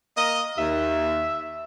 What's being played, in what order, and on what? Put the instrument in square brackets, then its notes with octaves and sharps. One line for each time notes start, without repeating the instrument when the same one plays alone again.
[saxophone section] A#3 A#4 D#5
[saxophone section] D#2 [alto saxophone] E5